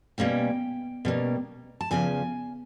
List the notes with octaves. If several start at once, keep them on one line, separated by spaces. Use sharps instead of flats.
B2 G3 A#3 C#4 G5
B2 G3 A#3 C#4
A5
E2 C#3 F3 G#5